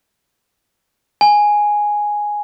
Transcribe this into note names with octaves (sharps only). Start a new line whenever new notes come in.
G#5